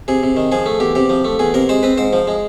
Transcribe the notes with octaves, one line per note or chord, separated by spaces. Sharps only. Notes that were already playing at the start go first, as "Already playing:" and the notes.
C3 G#4
C3
D#3
F3 G#4
A3
E2 G4
C3 G4
F3
A3
E2 G#4
C3 A#4
G#3 C5
C4 B4
G#2 C5
F3
G#3